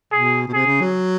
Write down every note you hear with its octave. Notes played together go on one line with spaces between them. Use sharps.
B2 G#4
B2
C3 G#4
C#3
F#3